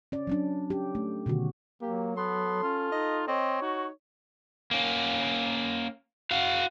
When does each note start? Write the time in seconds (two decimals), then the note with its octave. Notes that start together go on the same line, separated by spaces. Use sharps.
0.12 C#4 D5
0.27 F#3 C#4 D4
0.70 C#4 G4
0.95 A3
1.26 B2 D3 D#3 F#4
1.82 F#3 A#3 G4
2.17 B3 A4 C6
2.63 C#4 F4
2.92 D#4 D#5
3.28 C4 C#5 D#5
3.62 D#4 F#4
4.71 A#3 C#4
6.31 F#4 F5